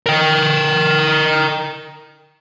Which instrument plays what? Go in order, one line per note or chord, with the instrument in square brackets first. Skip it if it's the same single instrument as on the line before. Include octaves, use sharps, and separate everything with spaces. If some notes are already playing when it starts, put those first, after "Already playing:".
[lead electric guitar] A#4 G5